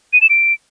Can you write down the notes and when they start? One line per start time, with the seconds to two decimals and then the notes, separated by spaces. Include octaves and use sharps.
0.13 D#7
0.21 E7
0.30 D7